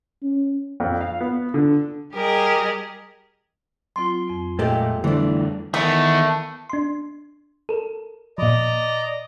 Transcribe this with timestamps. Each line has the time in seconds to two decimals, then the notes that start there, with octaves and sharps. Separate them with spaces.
0.23 C#4
0.80 F2
1.01 F5
1.21 B3
1.54 D3
2.14 G3 G4 G#4 A#4 D#5
3.96 F#3 C4 F4 C6
4.27 F2 C4
4.59 A#2 G#3 A3 G4
5.04 D3 E3 G3 A3 D4 E4 A4 C5
5.74 D#3 E3 A3 B3
6.70 D4 C6
7.69 A4 A#4
8.38 A#2 F3 D5 D#5 A#5